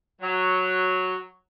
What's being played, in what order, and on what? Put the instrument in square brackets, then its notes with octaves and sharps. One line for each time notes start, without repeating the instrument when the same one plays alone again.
[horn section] F#3